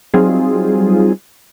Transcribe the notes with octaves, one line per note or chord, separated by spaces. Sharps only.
F#3 G3 C4 D#4 F4 G#4